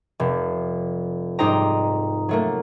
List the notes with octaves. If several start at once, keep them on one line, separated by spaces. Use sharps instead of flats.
F1
G#2 G3 D#4 C5 G5 A#5
F#3 A3 A#3